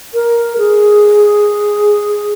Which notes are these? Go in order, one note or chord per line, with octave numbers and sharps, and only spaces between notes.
A#4
G#4